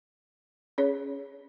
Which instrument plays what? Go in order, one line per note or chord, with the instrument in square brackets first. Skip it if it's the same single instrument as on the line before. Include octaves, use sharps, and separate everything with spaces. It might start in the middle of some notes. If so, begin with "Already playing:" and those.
[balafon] C#4 G#4 C#5